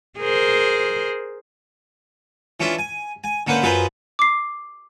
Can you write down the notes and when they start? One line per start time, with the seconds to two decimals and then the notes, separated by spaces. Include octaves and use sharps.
0.19 G#4 A#4 C5
2.60 E3 C#4 D4 F4 E5
2.78 G#5
3.24 G#5
3.47 D3 A#3 C#4 B4 C5
3.63 F#2 F4 G#4 B4 C5 A#5
4.19 D6 C7